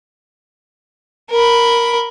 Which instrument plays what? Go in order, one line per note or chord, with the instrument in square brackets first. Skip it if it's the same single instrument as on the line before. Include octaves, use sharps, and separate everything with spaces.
[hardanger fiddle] A#4 B5